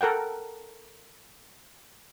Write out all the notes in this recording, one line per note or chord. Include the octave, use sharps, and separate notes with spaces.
A4 A#4 F#5 G5